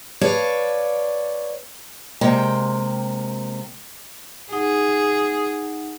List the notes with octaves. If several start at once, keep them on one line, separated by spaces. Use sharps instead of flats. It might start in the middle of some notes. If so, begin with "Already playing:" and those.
B4 C#5 D5 F5 A5
C3 G#3 A#3 G5
D#4 G#4 F#5 D#6